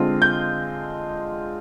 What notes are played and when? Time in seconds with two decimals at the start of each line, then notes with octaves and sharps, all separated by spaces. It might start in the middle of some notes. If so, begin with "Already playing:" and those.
Already playing: D3 G#3 C4 F4
0.22 G6